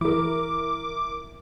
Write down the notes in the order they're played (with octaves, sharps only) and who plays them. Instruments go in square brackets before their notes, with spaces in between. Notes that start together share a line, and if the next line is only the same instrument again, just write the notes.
[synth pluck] E3 [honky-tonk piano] E4 A#4 [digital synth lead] D6